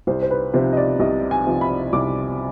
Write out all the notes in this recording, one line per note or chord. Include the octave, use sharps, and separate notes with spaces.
C2 C5
C5
B4
C3 F3 C5
D#5
D5
C2 D#5
G#5
C3 F3
B5
C2 D6